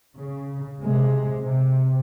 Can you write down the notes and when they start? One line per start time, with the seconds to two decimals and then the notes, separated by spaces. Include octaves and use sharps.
0.15 C#3
0.82 C3 G#3
1.39 C3